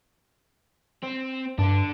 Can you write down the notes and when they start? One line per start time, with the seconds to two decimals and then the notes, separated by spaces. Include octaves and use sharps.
1.03 C4
1.58 G2 D3 D4